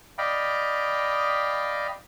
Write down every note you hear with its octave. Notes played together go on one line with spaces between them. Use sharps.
D5 D#5 F5 G5 B5